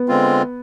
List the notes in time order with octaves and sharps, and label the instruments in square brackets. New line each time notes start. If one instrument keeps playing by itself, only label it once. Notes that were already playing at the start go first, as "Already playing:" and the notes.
Already playing: [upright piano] B3
[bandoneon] D3 G#3 C4 F4